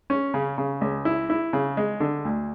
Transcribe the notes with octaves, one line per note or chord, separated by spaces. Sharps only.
C#4
C#3
C#3
C#2
E4
E4
C#3
G#3
D3
D2